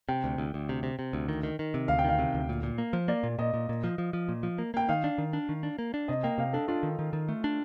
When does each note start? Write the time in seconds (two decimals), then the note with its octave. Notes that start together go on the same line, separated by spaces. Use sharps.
0.09 C3 G5
0.24 D2
0.38 D2
0.54 D2
0.69 C3
0.83 C3
0.99 C3
1.13 D2
1.29 D#3
1.43 D#3
1.59 D#3
1.74 C3
1.88 D2 F5
1.99 G5
2.04 D#3 F5
2.19 C3
2.34 D2
2.49 A#2
2.63 A#2
2.78 A#3
2.93 F3
3.08 A#3 D5
3.23 A#2
3.39 A#2 D#5
3.54 A#2
3.69 A#2
3.84 F3
3.98 F3
4.13 F3
4.29 A#2
4.43 F3
4.58 A#3
4.74 A#3 G5
4.89 D#3 F5
5.04 D4
5.18 D#3
5.33 D4
5.49 D#3
5.63 D4
5.79 A#3
5.94 D4
6.08 C3 D#5
6.23 A#3 G5
6.38 C3 F5
6.53 D4 A4
6.68 D4 F4
6.83 D#3
6.99 D#3
7.13 D#3
7.29 A3
7.44 D4